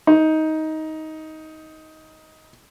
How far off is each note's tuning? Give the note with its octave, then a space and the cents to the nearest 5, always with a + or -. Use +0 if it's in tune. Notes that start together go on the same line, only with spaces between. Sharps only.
D#4 +15